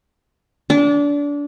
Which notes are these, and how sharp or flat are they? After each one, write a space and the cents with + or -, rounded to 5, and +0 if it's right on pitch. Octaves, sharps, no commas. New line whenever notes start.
D4 -25